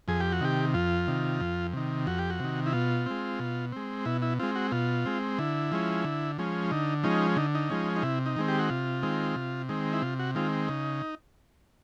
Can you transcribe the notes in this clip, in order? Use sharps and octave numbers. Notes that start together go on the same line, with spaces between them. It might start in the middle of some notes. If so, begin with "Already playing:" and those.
F2 G#4
G4
F#4
C3 D#3 G4
F2 F4
C3 D#3
F2
C3 D#3
F2 F#4
G4
F#4
C3 D#3
E4
B2 F4
G#3 C4
B2
G#3 C4
B2 E4
E4
G#3 C4 F4
F#4
B2 F4
G#3 C4
D3 E4
F3 G#3 C#4
D3
F3 G#3 C#4
D3 D#4
F3 G#3 C#4 D#4
D3 D#4
D#4
F3 G#3 C#4
D#4
C3 E4
D#4
D#3 G#3 C4
G4
F#4
C3 F4
D#3 G#3 C4
C3
D#3 G#3 C4
E4
C3 F4
F#4
D#3 G#3 C4 F4
C#3 D#4